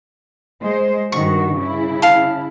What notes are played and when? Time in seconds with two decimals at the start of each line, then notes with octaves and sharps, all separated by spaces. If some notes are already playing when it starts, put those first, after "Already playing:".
0.61 G#3 C5
1.12 G2 D#3 F#4 C#6
1.56 C#3 E4
2.02 F5 A5